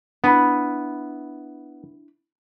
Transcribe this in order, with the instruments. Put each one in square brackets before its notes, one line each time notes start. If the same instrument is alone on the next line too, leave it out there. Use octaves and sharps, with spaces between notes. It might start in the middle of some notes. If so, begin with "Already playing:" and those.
[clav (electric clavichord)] B3 [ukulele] D4 E4 B5